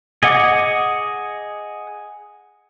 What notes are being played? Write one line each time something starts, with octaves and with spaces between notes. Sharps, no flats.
G#4 D#5 F#5 D6